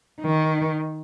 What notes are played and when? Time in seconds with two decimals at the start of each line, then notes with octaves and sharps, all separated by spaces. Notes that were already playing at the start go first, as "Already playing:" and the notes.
0.21 D#3